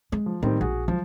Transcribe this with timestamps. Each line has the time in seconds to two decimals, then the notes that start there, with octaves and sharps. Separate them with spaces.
0.12 G#3
0.26 F3
0.43 A2 D#3 G3 C4
0.61 A#1 F#4 G#4
0.88 F3 F#3